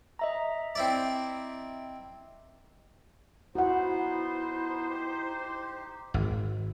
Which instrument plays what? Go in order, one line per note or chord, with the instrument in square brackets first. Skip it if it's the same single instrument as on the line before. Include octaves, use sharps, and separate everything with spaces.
[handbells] D#5 E5 A#5
[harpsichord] C4 E4 D5
[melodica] B3 D#4 [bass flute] E4 [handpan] F#4 F#5 [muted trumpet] C5
[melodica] D#4 G4
[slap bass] G#1